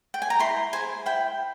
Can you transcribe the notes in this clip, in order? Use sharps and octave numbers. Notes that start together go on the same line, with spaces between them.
G5
G#5
A#5
E4 C6
G#4 C5 G#5
E4 G5